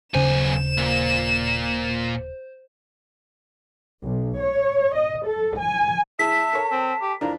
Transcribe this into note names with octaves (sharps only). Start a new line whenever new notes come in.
D#1 B1 C#3 C#4 C5 G#5 E7
A#2
B1
C#5
D#5
A4
G#5
E3 G#4 E5 A5 B6
A4 A#4 C#5
C4
G4
F2 E3 D4 A#4